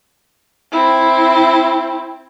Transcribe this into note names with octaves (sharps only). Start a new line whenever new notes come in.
C4 E4